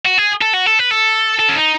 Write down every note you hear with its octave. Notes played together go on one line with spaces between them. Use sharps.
F#4
G#4
A4
F#4
A4
B4
A4
A4
C#4
D#4